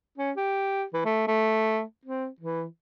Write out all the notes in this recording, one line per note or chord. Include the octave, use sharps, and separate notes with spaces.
C#4
G4
E3
A3
A3
C4
E3